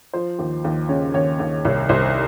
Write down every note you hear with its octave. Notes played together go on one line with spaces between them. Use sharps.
F3 C5
D#2
D#2
C#3 C#5
D#2 C#5
D#2
C2 C#5
C2 C5